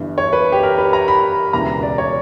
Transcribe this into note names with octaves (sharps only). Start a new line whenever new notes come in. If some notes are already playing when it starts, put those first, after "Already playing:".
Already playing: G1 G2 E3
C#5
B4
G4
A#4
B4
A#5
B5
E1 D2 C#3 E3 A#5
D5
C#5